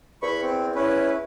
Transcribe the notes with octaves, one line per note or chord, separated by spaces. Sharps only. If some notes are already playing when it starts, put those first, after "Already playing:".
E2 B5 C#6
C4
C#4 E4 B4